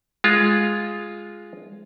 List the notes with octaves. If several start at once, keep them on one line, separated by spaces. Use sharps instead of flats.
G#3 F4